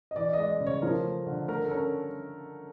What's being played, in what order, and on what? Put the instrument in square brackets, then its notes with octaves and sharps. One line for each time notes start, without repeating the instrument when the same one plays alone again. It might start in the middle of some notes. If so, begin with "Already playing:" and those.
[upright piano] D#5
E3 D5
G#3 D#5
D5
C#3
C#5
F3 A#4
A3
D3
A3 A#4
A4
C#4 A#4